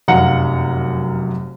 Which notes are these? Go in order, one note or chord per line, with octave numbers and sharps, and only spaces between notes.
F1 F#2 F5 F#5 A#5 C#7